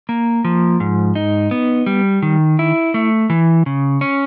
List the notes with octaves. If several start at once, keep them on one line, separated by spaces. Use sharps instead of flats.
A#3
F3
G#2
D#4
B3
G3
D#3
E4
A3
E3
C#3
C#4